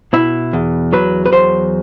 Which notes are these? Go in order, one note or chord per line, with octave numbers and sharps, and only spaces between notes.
B2 E4
E2
F#3 B4
B4
E2 C5